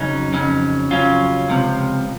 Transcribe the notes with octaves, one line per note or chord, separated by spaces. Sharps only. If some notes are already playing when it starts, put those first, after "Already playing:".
Already playing: F2 C#3 F#3 C#4 D#4
F2 C#3 F#3 C#4
F2 C#3 F#3 C#4 F4
C#2 C3 F3